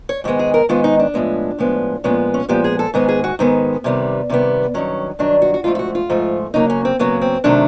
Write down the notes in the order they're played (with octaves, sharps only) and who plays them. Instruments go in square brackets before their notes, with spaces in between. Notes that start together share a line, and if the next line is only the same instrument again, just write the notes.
[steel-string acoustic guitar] C#5
G#2 D#3 G#3 B3
G#4
A#4
G#2 D#3 G#3 B3 F4
D#4
D4
A2 F3 G#3 B3
A2 F3 G#3 B3
A#2 F3 G#3 B3 C#4
C#4
A#2 F3 G#3 B3 G4
G#4
A4
G#2 D#3 G#3 B3 G#4
G#4
F#4
G#2 D#3 G#3 B3
C3 D#3 G3 B3
C3 D#3 G3 B3
G2 D#3 F#3 C#4
G2 D#3 F#3 D4
F#4
F#4
G#2 F3 A3 F4
F4
F#4
F4
G#2 F3 A3
C#3 F#3 A#3 D#4
C#4
C4
C#3 F#3 A#3 B3
C4
C3 D#3 F#3 A3 D4